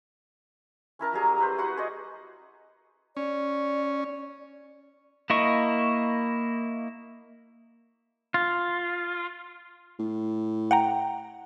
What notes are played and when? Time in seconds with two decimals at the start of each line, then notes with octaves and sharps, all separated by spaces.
0.99 C#4 E4 A#4 A5
1.13 F#3 G3 G#4 A#5
1.38 E4 B4 C5
1.58 F#4 B4 F#5 C#6
1.77 G#4 C5 D5 D#5
3.17 C#4 D5
5.30 A#3 E4 D#5 C#6
8.34 F4
9.99 A2
10.71 F#5 G5 A#5